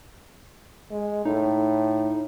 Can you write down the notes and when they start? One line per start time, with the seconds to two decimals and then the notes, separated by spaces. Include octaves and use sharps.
0.91 G#3
1.25 A2 D#4